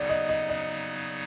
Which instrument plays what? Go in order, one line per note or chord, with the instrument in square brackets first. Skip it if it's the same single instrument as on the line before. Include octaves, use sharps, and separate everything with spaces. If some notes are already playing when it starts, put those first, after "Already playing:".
Already playing: [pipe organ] C#3 F#3 B3 D#4 [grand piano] D5
[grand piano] D#5
D#5
D#5